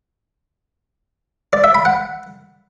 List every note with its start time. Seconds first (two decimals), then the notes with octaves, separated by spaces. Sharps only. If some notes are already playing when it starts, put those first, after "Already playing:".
1.53 D5
1.64 E5
1.75 B5
1.85 F#5